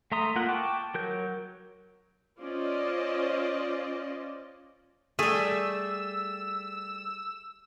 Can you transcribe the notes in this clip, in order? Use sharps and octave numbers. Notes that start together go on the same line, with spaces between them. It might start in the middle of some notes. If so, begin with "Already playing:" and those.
A3 E5 A#5 C6 D#6
A#3 F4 F#5
G5 A5 C#6 D6
F#3 A#4 G6
C#4 F4 C5 D5 D#5
G3 A3 G#4 E6